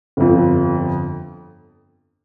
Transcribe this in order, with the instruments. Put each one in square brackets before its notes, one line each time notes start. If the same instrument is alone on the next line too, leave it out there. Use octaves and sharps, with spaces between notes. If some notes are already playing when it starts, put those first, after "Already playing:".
[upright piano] G1 F2 F3